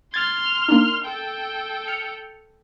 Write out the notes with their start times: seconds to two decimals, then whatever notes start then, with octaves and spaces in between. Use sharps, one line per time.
0.14 C6 F6 G#6 A6
0.68 A#3 D4 D#4
1.04 A4 G5
1.88 F6 C#7